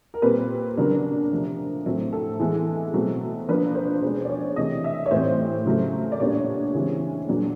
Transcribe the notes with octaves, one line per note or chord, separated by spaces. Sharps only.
A#4
A#2 G3 C4 B4
C#3 F#3 B3 D4 A#4
C3 F3 A3
A2 F#3 A3 C4
A4
E3 G#3 B3
B2 F#3 A3 C4
F3 A#3 D4 B4
C5
B2 G#3 C#4 C5
D5
C#5
C3 E3 A3 C4 D#5
E5
C#5
A2 E3 G3 C4 C5
C#3 F#3 A3
D5
A#2 G3 B3 D4 C#5
C#3 E3 G#3 C4
A#2 F#3 B3 D4